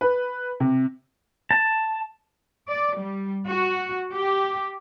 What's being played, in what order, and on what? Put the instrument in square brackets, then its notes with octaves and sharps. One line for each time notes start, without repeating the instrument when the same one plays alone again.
[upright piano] B4
C3
[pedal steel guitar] A5
[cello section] D5
G3
F#4
G4